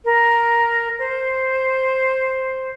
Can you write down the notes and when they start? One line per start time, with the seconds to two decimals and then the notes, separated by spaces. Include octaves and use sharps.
0.05 A#4
0.99 C5